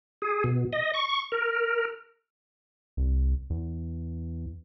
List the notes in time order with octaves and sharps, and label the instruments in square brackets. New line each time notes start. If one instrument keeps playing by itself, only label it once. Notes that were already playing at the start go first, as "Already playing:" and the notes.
[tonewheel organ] G#4
B2
D#5
C#6
A#4
[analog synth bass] C2
E2